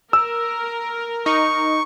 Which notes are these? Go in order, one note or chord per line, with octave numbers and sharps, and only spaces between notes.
A#4 E6
D#4 C#6